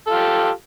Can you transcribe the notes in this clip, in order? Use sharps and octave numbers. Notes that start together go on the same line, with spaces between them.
F4 G4 A4